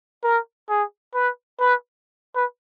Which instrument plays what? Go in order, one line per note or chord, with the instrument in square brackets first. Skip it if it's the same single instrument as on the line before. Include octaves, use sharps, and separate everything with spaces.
[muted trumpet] A#4
G#4
B4
B4
B4